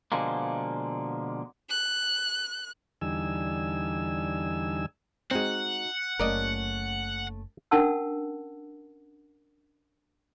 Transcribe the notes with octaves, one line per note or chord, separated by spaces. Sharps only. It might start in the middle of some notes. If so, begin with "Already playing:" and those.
B2 D3 F3 G#3 A#3
F#6
E2 D3 G3 D#4 G#5 E6
G#3 C4 D#4 F#4 F#5
F#1 A3 A#3 C#4 A#4 D5 D#5
C#4 D4 A#4 F#5 A5 E6